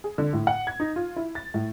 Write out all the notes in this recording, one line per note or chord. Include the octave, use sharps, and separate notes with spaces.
G#4
D3
A2
F#5
G#6
D#4
F4
E4
A6
A2